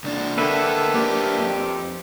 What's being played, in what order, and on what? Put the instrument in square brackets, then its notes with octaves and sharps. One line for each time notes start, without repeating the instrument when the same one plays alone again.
[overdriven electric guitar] C2 D4
[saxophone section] D3 [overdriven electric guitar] A#3 G4 [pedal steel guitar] A4 B4 E5
[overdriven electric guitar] A#3 D4 [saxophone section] D#4 G4
[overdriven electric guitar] F2